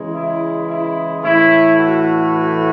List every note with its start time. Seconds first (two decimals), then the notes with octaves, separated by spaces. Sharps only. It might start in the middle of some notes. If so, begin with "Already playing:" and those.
Already playing: C#3 E3 G#3
0.15 E4
0.69 E4
1.23 A2 E3 A3 E4
1.78 F#4
2.32 F#4